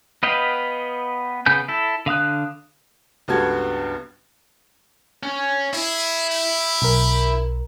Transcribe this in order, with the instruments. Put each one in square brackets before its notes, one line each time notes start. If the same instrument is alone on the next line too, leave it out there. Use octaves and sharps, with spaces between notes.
[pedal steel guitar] B3 B4 D#5 F5 G5
C#3 B3 G#5 G6
E4 A4
D3 F5 D#6 F#6
[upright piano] C#2 G2 B3 F#4 A4 G#6
[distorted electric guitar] C#4
[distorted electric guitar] E4 [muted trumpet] G#4
[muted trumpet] G4
[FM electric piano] B1 A#4